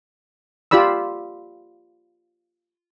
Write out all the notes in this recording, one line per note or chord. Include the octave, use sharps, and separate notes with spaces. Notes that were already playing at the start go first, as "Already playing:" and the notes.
F4 G4 D5 B5 E6